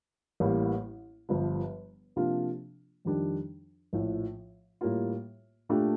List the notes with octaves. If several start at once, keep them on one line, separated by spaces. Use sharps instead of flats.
A1 A2 G3 A#3
G1 G2 F3
C3 F3 A#3 D4 F4
F2 D#3 G3 D4 G4
A#1 A2 F3
A2 G3 A#3 F4
A#2 A3 D4 G4